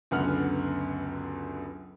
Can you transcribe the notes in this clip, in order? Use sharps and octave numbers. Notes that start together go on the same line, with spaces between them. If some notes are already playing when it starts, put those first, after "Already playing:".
C#2 F#2 D3 B3 F#5 F6